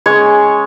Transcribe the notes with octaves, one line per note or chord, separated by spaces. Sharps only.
G#3 C#4 C#5